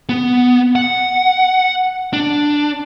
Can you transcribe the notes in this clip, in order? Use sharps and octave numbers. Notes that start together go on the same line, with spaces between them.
B3
F#5
D4